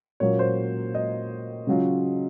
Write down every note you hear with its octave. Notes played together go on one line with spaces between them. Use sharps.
A#2 F#3 A#3 C#4 F4 C#5
C5
D#5
C#3 F#3 C#4 F4